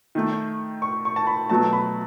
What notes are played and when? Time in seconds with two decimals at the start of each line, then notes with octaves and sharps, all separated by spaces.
0.15 D#3 A3
0.82 C#6
1.05 C#6
1.16 A5
1.27 B5
1.50 B2 F#3 A3 A5
1.73 B5